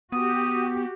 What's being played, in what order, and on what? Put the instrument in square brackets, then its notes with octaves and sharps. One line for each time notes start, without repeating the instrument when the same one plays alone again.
[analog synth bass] B3 [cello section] F#4 G4 [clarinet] D#6